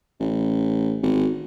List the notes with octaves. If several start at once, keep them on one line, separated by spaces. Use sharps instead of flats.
A1
G#1